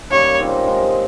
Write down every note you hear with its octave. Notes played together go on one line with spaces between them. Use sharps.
C#3 G3 A#3 D#4 C#5
A#2 G3 C4 D#4
F3 G#3 D#4 A#4